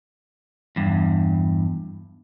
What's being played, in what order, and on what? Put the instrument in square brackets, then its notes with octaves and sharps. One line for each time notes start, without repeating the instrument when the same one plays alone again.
[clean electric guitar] E2 G2